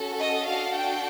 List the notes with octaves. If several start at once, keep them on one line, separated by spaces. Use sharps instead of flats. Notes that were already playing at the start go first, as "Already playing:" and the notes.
Already playing: C#4 F#4 A4
D#5
D4 F#4 A4 F5
G5